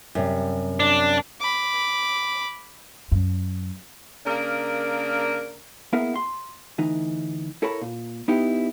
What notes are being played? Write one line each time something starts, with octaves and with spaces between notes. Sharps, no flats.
F#2 C3 G3
D4
B5 D6
F#2
C#3 A#3 D4 A#4
A#3 B3 E4 G#4 A#4 E5
C6
D2 E3 D#4
E4 A4 A#4 C#5 A5 B5
A#2
B3 D#4 E4 G4